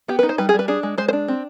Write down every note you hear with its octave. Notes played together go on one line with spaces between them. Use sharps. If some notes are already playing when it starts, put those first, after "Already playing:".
B3 G4
B4
D#4
C5
G3 B4
G#4
G3
B4
D4 G#4
G#3
G#3 C5
C5
D4
C4